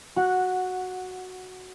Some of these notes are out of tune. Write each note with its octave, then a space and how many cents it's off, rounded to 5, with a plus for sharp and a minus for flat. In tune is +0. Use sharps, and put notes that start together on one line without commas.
F#4 +0 F#5 -10